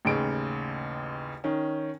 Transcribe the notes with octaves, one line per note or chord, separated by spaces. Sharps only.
A1 D#2 C#3 D7
D#3 C#4